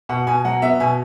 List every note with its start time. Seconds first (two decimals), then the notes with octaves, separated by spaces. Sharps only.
0.09 B2 F#5
0.27 B2 G#5
0.45 F#3 F#5
0.62 B3 E5
0.80 B2 G#5